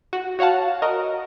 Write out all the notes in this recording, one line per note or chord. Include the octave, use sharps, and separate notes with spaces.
F#4
F#4 C#5 F5 F#5 A5
F#4 A#4 D#5